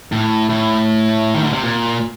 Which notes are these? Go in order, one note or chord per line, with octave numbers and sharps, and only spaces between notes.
A2
A2
D#3
D3
C3
A#2